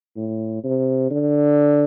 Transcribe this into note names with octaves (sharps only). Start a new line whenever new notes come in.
A2
C3
D3